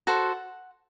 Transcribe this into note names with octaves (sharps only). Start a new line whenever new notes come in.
F#4 A4 C5 F#5